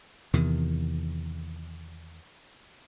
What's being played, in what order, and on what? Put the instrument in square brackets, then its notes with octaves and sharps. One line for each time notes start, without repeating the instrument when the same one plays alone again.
[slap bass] E2 C3 D#3